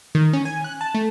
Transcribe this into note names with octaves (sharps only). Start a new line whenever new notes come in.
D#3
C#4
G#5
F#6
A5
A3